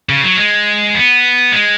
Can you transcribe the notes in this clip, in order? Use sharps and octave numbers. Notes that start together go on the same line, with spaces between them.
C#3
F#3
G#3
B3
G#3